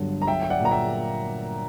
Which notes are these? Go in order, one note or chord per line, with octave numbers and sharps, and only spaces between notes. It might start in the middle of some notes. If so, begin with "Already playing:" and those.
Already playing: G1 G2 D3 F#3
A#5
F#3 E5 G5
G5
D5 F#5
A#2 A#5
E5 G5